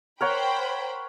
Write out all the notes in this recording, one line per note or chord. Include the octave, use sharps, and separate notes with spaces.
A#4 C5 C#5 F#5 G5 B5